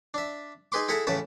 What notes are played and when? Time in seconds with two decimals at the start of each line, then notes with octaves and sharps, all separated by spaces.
0.14 D4 E5
0.72 D#4 G#4 B4 C6 D6
0.88 E4 G#4 A4 E5 F#5 A#5
1.07 A1 A2 C#3 B4 A5